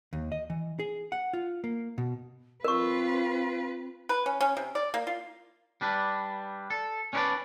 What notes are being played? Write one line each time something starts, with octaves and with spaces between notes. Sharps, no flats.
D#2
D#5
E3
G#4
F#5
F4
A#3
B2
C4 F4 A#4 B4 C#6
B4
C#4
C#4
C3
D5
A#3
F4
G3 D4 B4
A4
C#4 D4 E4 A4 B4 D5